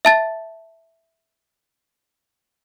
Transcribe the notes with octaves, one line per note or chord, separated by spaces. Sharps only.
E5 A5 A6